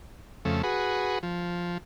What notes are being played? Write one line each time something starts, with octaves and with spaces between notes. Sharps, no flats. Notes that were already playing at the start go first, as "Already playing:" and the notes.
F2 C#3 A3
F#4 G#4 B4
F3